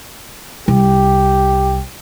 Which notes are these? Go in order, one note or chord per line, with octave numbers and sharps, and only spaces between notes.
C2 G4